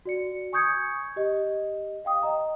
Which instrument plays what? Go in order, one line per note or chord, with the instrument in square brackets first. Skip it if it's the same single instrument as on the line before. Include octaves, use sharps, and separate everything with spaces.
[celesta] F#4 D5 C#7
G#5 C#6 D#6 G6 G#6 C#7
G4 D#5
F5 G5 D#6
D#5 A#5